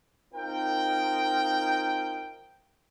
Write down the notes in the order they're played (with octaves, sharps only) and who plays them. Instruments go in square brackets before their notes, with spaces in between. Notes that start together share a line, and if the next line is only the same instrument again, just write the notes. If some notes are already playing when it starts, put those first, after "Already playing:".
[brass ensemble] C4 D#4 F4 A#4 G5